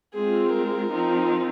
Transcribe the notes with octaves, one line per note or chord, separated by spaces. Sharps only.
G#3 C4 F4 G#4
A#4
F3 C4 D#4